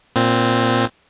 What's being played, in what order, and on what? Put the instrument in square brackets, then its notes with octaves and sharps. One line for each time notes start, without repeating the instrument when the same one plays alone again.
[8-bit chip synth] A#2 C4